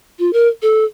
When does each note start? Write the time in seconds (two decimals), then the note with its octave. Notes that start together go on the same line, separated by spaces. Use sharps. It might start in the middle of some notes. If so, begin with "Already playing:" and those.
0.19 F4
0.33 A#4
0.62 A4